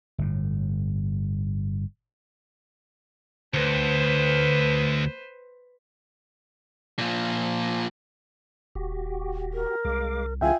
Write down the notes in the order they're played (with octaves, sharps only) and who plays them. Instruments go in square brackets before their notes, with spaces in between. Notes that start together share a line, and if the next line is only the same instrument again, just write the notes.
[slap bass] G1 A2
[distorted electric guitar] D2 [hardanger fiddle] B4 C5
[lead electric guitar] A#2 F3
[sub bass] D#1 [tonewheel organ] F#4 G4
[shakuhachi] A#4
[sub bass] C2 [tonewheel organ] G#3 F5 D6
[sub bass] C2 [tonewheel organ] C#3 E3 G#3 [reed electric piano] F4 E5 G5 [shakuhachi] G#5